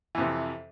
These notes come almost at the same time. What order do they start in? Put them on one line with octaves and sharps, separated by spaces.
E3 F2 C3